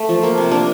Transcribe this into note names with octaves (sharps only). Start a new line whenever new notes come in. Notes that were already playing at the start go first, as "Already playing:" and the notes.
Already playing: A3
F3
A#3
C3
A#3 D4